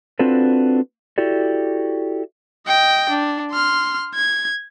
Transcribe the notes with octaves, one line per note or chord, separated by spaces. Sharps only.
C4 D4 F4 F#4 A4 B4
E4 F#4 G4 A4 D5
D#5 G5
D4
C6 F6
G#6